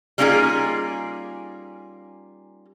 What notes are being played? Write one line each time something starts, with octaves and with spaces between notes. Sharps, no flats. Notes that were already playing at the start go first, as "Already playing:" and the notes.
G3 A#3 C#4 D#4 F4 G#4